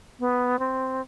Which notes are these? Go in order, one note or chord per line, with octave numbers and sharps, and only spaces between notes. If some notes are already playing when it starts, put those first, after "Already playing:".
B3
C4